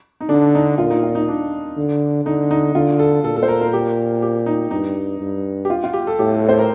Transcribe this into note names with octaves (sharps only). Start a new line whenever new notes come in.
D#4
D3 D4
D#4
A#2 F4
D#4
F4
D#4
D4
D3
D3 D#4
D#4
D3 F4
A4
A#2 A4
A4
C5
A#4
A#4
G4
G4
D#4
G2 D#4
G2
G4
F4
F4
G4
A4
A2 G4
C5
A#4